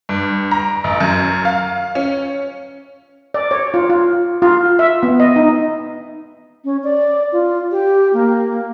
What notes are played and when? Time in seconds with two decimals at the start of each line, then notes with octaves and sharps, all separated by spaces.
0.09 G2
0.51 A#5
0.84 A1
1.00 F#2
1.45 F5
1.95 C#4
3.34 D5
3.51 C#5
3.74 F4
3.90 F4
4.42 F4
4.79 E5
5.03 B3
5.20 D#5
5.36 D#4
6.64 C#4
6.84 D5
7.32 F4
7.71 G4
8.13 A#3